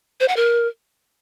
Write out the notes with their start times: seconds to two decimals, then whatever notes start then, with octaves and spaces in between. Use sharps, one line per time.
0.20 C5
0.28 F#5
0.36 A#4